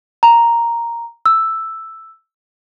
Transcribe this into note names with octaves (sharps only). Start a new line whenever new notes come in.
A#5
E6